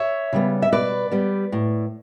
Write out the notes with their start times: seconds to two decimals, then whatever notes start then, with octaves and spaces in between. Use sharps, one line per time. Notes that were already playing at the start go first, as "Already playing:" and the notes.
Already playing: C#5 E5
0.33 C#3 G3 B3
0.62 E5
0.72 B2 B4 D5
1.11 G3 B3
1.52 A2